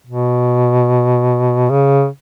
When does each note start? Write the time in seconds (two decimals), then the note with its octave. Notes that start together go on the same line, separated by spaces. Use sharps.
0.07 B2
1.70 C#3